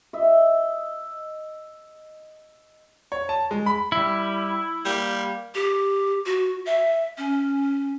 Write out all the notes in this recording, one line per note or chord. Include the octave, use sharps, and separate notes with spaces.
D#5 E5
C#5
A5
G#3
B5
G3 E4
G3 A#3
G4
F#4
E5
C#4